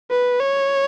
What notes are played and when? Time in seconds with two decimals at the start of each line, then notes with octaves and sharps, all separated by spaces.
0.11 B4
0.40 C#5